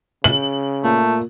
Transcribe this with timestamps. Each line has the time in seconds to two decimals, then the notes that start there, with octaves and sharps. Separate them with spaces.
0.24 C#3 F#7
0.84 A#2 A3